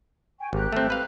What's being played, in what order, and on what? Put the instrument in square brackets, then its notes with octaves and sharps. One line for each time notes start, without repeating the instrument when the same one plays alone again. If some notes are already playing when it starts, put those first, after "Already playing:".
[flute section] G5 G#5 C#6
[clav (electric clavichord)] G#1 [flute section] G4 A#5 F#6
[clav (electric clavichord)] A3 C4
B4 F5